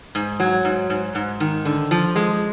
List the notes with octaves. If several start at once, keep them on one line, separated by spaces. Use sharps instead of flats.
G#2
F#3
G#2
G#2
G#2
D#3
D3
F3
G#3